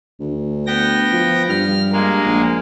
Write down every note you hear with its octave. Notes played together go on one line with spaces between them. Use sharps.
D2
B3 G5 A#6
F3
G2 F6
G#3 A#3
A#1